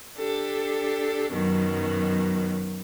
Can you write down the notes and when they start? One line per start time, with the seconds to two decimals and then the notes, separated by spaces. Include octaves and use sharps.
0.17 D4 G4 A4
1.32 F#2 B2 D#3 F#3